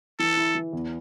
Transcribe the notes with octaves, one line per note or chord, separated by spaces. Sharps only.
E3 A4
E4
E3
E2